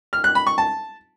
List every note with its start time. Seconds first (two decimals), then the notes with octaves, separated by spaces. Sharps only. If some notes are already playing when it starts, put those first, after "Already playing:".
0.13 F6
0.24 F#6
0.35 B5
0.47 C#6
0.58 A5